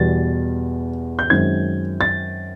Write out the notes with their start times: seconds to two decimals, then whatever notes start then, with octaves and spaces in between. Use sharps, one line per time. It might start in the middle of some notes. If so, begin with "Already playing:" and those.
Already playing: E2 B2 G3 A6
1.19 G6
1.30 F#2 D#3 G#3 C4 G#6
2.01 A6